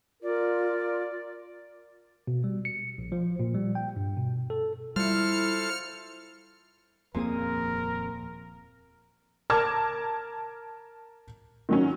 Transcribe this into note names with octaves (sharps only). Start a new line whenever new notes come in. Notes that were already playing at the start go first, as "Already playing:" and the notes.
F4 A#4 D5
B2
G3
C#7
A#1
F3
A#2
G3
G5
G2
B2
A4
G3 E4 F4 A4 C5 F6 C#7
D#1 F2 A#2 C4 G#4 A#4 D#6
A#4 A5 D6 F6 G#6
D#3 F#3 C#4